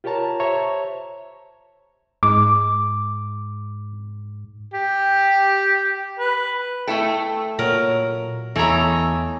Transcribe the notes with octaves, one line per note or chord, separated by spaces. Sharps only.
F4 G4 A#4 C#5 A5 A#5
C5 C#5 E5 A5 A#5 C#6
G#2 D6
G4
B4
A3 E4 A4 G5
A#2 F#3 A#4
E2 E3 A3 C#5 D#5 G#5 A#5 E6